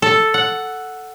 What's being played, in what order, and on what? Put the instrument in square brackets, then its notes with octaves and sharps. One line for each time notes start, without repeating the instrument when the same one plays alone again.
[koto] A4
F#5